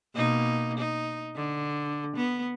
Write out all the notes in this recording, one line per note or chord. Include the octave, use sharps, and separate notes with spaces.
B2 A#3 D#4
D#4
D3
B3